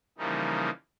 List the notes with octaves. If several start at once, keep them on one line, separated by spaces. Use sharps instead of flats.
C#3 E3 F3 G3 A#3 D#4